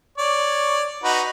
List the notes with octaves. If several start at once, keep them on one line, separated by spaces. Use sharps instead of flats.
C#5 D5
D#4 F#4 B4